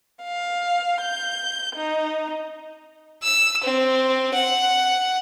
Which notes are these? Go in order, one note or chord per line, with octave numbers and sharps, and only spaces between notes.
F5
G6
D#4
E6
C4
F#5